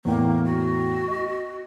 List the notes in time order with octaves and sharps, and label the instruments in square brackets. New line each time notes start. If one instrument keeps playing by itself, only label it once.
[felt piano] E2 A2 G5 [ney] A#3
[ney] F#4
[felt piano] D#5